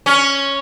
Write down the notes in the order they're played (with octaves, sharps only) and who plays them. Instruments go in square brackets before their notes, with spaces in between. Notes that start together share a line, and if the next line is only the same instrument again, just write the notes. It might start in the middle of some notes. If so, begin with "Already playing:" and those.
[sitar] C#4